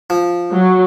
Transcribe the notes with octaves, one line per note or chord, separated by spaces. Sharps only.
F3
F#3